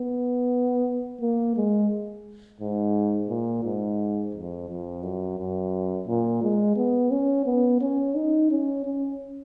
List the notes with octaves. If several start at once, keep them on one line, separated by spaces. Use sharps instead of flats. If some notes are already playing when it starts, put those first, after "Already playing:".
Already playing: B3
A#3
G#3
G#2
A#2
G#2
F2
F2
F#2
F#2
A#2
G#3
B3
C#4
B3
C#4
D#4
C#4
C#4